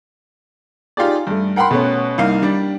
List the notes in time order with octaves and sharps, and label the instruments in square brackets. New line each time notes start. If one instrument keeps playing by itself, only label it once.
[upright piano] D#4 F4 G4 G#4 D5
G2 A3
A#4 F#5 G5 B5 C6
B2 A3 B3 C#4
C2 A#3 D#4 F5
G3 D4